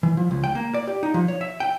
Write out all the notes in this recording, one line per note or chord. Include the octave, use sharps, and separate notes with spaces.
E3
F3
C#2
G5
A#3
D5
G4
D#4
F3
C#5
E5
G5